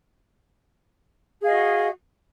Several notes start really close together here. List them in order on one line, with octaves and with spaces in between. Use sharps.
G#4 F5 D#5 F#4